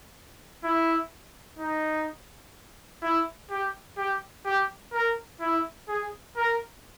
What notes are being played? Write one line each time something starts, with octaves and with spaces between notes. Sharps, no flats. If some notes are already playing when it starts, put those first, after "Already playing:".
E4
D#4
E4
G4
G4
G4
A#4
E4
G#4
A#4